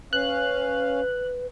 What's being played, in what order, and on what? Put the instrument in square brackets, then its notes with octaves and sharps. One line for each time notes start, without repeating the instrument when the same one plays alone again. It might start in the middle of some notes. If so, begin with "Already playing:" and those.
[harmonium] C#4 F5 [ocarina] B4 [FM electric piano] F#6